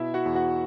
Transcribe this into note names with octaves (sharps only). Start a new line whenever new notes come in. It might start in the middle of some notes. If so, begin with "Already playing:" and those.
Already playing: B2 E4 E5
F#4 F#5
E2
F#4 F#5